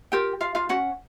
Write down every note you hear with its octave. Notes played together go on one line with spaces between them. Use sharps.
F4 G4 A#4 G5
F4 F5
F4 F5
C#4 F#4 F#5